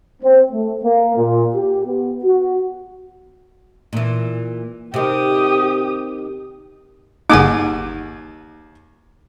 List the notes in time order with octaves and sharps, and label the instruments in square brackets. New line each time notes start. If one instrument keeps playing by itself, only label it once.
[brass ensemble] C4
A3
A#3
A#2
G4
B3
F#4
[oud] A#2 E3
[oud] C3 D#3 [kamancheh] G4 D#6
[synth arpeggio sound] G1 D#4 [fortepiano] D#2 G#5 D6 [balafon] A#3 G#4 F#5